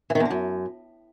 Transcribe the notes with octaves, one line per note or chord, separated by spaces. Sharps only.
E3
D#3
E2
D3
F#2